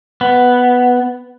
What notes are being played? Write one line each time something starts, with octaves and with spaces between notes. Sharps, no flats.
B3